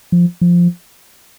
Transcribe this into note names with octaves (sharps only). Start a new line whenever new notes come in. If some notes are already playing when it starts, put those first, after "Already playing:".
F3
F3